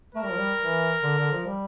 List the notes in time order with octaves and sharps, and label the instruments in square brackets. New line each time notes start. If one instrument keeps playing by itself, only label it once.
[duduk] A3 [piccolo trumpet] A#4
[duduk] G3
F3
G3
E3
D3
D3
F3
G3